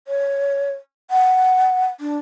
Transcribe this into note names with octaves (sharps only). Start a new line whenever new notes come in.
C#5
F#5
D4